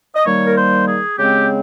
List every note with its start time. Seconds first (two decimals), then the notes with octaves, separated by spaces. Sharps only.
0.16 D#5
0.26 D#3 G3 A#3 C#5
0.46 A#4
0.56 C5
0.88 G#4
1.18 C#3 G#3 C4 G4